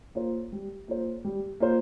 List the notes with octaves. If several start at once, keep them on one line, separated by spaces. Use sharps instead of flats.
A#3 F4 C5
G3
A#3 F4 C5
G3
A#3 F4 C5